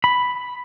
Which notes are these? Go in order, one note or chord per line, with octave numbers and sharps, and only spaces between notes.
B5